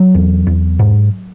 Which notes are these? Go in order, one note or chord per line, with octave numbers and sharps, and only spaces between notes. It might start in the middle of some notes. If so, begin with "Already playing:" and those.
Already playing: F#3
E2
E2
G#2